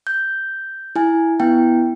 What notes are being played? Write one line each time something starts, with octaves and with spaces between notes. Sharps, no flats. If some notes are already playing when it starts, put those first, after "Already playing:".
G6
E4 G#5
B3 E4 G5